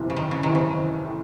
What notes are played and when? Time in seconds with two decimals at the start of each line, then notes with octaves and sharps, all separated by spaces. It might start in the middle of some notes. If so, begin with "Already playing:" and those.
Already playing: F#1 E2 C3 E3
0.10 C#3
0.17 D#3
0.31 C#3
0.43 F#1 E2 C3 D#3 E3
0.55 C#3
1.04 A2 E3